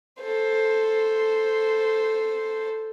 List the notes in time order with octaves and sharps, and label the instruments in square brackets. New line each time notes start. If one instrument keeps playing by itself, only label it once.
[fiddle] A4 C5